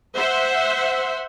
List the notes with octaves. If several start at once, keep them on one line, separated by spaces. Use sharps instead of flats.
C5 E5 F#5